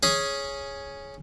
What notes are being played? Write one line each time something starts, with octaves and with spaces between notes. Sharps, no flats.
C#4 G#4